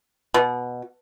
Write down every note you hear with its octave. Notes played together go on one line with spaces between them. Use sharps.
B2